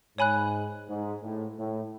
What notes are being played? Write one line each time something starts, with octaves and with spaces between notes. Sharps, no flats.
G#2 C#5 G#5 B5 F#6
G#2
A2
A2